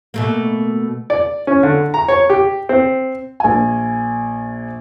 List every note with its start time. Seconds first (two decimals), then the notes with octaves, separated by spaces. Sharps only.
0.14 B2 A3 A#3
1.10 D5
1.47 C#4
1.63 D3
1.94 A#5
2.08 C#5
2.30 G4
2.69 C4
3.40 A#1 G#5